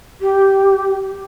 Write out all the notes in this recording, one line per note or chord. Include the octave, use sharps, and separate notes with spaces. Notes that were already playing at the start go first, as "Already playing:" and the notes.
G4